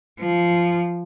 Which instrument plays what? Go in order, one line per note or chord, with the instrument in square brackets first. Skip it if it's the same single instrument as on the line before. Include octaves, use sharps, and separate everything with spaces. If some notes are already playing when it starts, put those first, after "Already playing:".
[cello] F3